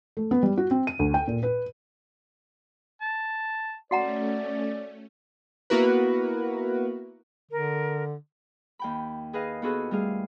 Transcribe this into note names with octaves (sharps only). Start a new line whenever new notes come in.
A3
B3
G3
F#4
C4
D#7
D2
G5
A#2
B4
A5
A3 C#4 F#4 D5 F#5 A#5
A#3 B3 E4 F#4 A#4 B4
D3 A#4
D#2 G5 B5
G#4 B4 D#5 F5
B3 F4 F#4 G#4 A4 B4
G3 A3 G#4 F5